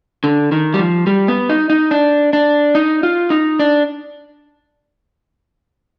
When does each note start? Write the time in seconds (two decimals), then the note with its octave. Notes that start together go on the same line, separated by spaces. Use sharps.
0.24 D3
0.52 D#3
0.74 G3
0.79 F3
1.07 G3
1.28 B3
1.49 D#4
1.70 D#4
1.91 D4
2.33 D4
2.75 D#4
3.03 F4
3.30 D#4
3.59 D4